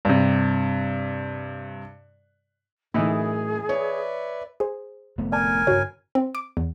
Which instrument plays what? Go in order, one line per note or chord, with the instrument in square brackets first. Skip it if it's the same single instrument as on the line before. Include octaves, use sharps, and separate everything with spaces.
[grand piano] G2 C3
[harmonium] F#2 [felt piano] A2 [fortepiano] E3 D#4 E4 [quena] G#4
[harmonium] B4 D5 E5 [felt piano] C#5
[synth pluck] G#4 C5
[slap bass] F1 A3 B3
[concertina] A#4 G#5 [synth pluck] D5 A5
[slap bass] G2 C#3 [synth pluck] F#4 C#5
[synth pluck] C4
D6
E2